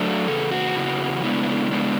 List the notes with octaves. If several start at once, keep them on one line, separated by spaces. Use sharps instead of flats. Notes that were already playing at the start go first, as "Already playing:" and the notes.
Already playing: F#3 A3 D4
E2 C#3 A4
F#4
E2 C#3 E3
C#3 G#3 B3 D4 E4
C#3 G#3 B3 D4